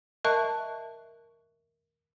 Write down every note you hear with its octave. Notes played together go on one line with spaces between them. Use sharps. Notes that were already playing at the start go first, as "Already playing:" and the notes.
A#4 D#5 E5 A5 C#6 F#6